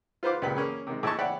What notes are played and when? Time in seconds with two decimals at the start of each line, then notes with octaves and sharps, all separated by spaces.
0.23 F4 B4 C5 F5 D6
0.42 C#2 A#2 G4 B4 B5
0.57 A#3 C#4 G#4
0.87 C3 D#3 G#3
1.03 A2 E4 D#5 G#5 A5 C#6
1.19 C#5 D5 E5 F#5 G5 B5